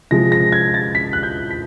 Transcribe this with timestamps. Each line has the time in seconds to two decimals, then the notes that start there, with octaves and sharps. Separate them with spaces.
0.11 C3 F3 G#3 A#6
0.32 A#6
0.52 G#6
0.74 A6
0.95 B6
1.13 F#6
1.23 G6
1.50 B6